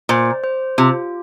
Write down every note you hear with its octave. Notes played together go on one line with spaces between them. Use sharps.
A#2 C5
C5
C3 F4